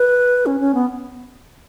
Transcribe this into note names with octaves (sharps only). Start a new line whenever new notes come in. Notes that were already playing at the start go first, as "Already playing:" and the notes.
Already playing: B4
C#4
C#4
B3